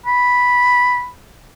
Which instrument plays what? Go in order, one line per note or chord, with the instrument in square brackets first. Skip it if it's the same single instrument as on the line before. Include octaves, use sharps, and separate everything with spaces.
[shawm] B5